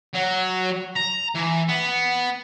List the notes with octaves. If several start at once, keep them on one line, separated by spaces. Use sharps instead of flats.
F#3
A#5
E3
B3